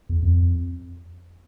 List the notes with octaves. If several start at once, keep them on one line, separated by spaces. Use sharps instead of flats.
E2
F2